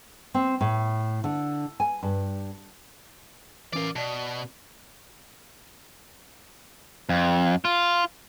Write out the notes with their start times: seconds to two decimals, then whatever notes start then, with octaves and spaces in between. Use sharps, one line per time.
0.34 C4
0.61 A2
1.24 D3
1.80 G#5
2.03 G2
3.73 E3 C#4 A#4 D5 F5
3.96 B2 D5 A5
7.09 F2
7.65 F4